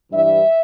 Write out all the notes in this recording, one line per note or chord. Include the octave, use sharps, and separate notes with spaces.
G2 E3 G3 E5